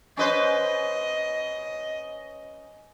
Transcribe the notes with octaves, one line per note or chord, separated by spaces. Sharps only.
C#4 B4 C5 D#5